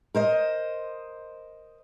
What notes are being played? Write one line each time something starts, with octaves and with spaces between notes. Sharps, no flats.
A#4 C5 D#5